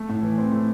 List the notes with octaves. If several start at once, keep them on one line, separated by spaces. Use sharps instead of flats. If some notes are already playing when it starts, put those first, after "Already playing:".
Already playing: A3
A2
E3
C4
A3